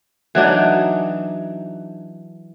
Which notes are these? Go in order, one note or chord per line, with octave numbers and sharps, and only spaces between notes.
E3 F#3 D4 D#4